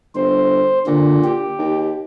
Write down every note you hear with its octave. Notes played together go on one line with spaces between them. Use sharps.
G1 C5
A#2 D3
G4
D#2